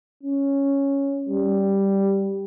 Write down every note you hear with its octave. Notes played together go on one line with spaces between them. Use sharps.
C#4
G3